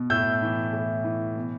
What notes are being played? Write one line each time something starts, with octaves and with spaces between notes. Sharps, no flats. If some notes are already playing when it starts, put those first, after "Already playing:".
Already playing: B2
A2 E6 G6
E3
A2
E3
B2